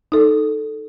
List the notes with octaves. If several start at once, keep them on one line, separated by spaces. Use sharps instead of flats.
D#4 A4